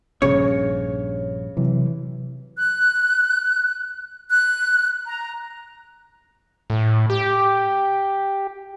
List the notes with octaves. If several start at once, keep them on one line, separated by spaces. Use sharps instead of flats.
A#1 G2 C#3 C#5
C3 E3 F#3
F#6
F#6
A#5
A2
G4